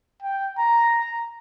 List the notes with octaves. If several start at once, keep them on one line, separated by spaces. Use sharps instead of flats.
G5
A#5